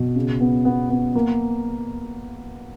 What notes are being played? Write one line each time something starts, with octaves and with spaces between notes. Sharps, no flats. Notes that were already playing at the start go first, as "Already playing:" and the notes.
Already playing: B2
C#3
B3
B3
B3
A#3